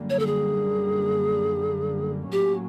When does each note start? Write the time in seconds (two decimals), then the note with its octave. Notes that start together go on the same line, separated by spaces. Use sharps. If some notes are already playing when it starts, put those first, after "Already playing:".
Already playing: F#2 D3 G3 A#3
0.10 C#5
0.19 A4
0.27 G#4
2.32 A2 F#3 A#3 C#4 G4